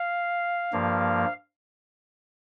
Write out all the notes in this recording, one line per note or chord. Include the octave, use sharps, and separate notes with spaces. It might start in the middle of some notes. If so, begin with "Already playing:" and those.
Already playing: F5
G2 F3 A#3